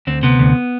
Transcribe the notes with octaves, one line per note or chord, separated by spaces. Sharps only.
D2 C4
C3 B3
D2